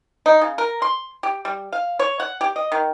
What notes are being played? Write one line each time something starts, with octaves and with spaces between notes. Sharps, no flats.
D#4
C#3
A#4
C6
G4
G3
F5
C#5
F#5
G4
D#5
D#3